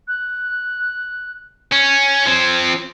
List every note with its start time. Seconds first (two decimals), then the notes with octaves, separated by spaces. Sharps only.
0.07 F#6
1.72 C#4 G#6
2.26 F3 C4